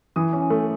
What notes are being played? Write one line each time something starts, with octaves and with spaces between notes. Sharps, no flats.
E3 D#6
C#4
A3